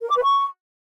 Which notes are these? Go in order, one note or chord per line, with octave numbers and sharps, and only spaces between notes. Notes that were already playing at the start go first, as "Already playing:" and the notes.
A#4
D6
B4
C#6